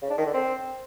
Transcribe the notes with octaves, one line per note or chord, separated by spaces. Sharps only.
C#3
D4
D#3
D3
C4